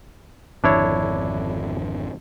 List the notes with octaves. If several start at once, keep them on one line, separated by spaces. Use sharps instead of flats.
G#1 F2 D3 D4 E4 C#5